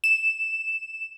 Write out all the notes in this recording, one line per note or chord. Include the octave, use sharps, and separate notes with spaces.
E7